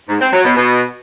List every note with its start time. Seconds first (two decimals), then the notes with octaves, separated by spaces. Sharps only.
0.09 G#2
0.21 C4
0.33 F#3
0.45 B2
0.56 B2